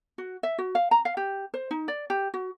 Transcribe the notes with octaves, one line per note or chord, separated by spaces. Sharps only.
F#4
E5
F#4
F5
A#5
F5
G4
C5
D#4
D5
G4
F#4